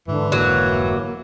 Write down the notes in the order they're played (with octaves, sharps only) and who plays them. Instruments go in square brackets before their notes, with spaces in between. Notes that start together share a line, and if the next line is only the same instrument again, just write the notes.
[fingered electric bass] G#2 [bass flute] D3 [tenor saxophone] E3
[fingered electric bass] F1 G#2 D3 [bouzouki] F#3 [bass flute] A#3